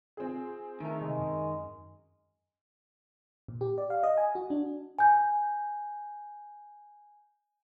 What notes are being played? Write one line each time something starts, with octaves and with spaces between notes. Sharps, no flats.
C4 F4 G#4
D3 D#3 A3 A#4
C3 G#3
F#2
A#2
G4
D5
F5
D#5
G#5
F#4
D4
G#5 G6